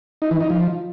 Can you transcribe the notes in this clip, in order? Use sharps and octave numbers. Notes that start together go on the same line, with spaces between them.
D#4
E3
D#4
F3